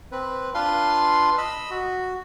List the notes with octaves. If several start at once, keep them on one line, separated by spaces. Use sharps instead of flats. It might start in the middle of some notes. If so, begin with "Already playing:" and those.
C4 B4
D4 F4 B4 F5 C6
D#5 B5 E6
F#4